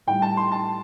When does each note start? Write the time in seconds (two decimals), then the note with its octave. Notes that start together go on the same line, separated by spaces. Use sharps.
0.07 A2 G3 G5
0.22 A5
0.37 C6
0.52 A5